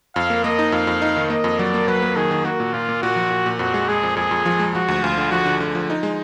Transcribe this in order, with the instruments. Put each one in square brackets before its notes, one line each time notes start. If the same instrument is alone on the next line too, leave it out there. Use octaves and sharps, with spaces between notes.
[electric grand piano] F2 [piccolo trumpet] F5
[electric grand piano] A#3
[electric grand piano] A#3 [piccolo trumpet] D#5
[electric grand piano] D#4
[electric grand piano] F2 [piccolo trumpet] F5
[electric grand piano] F2
D#4
D#3
[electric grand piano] A#3 [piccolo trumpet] D#5
[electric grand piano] F2
[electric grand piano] F#3 [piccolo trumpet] D5
[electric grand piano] A#3
[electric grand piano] F#3 [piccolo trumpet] B4
[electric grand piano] A#3
[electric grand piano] D#3 [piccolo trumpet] G#4
[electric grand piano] D#3
[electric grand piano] A#3 [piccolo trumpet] F#4
[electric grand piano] A#2
[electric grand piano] A#2 [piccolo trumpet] F4
[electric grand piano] A#2
[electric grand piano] A#2 [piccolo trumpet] F#4
[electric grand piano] F3
A#2
A#2
[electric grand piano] F2 [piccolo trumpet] F#4
[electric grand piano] G#3
[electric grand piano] G#3 [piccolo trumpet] G#4
[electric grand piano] F2
[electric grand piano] F2 [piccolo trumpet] G#4
[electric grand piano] F2
F3
G#3
[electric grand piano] F3 [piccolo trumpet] F#4
[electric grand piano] D2
[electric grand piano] D2 [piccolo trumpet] F4
[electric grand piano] D3
[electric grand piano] F3 [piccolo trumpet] F#4
[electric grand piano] D3
D3
F3
D#4
G#3